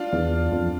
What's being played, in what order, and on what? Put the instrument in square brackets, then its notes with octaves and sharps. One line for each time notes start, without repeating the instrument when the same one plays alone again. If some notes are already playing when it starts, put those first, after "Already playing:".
Already playing: [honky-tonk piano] D4 F4
[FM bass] E2
F2